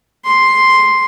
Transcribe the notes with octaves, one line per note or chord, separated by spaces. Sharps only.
C6